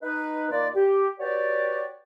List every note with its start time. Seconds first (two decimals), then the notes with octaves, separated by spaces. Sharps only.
0.03 D#4 B4
0.50 A#2 D#3 A#3 F4 D5
0.75 G4
1.19 F#4 G4 B4 C#5 D5